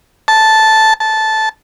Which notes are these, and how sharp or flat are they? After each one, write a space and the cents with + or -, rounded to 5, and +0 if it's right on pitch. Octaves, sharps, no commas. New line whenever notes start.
A5 -5
A5 -10